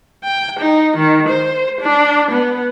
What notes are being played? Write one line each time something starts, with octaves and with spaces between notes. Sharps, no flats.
G5
D#4
D#3
C5
D4
B3